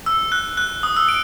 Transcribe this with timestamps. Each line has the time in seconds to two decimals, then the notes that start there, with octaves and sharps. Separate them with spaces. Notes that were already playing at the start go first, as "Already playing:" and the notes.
0.06 E6
0.32 F#6
0.57 F#6
0.83 D#6
0.97 E6
1.09 D7